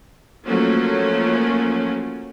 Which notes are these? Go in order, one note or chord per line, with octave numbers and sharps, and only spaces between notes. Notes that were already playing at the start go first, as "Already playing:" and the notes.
F3 F#3 A3 A#3 C#4 F#4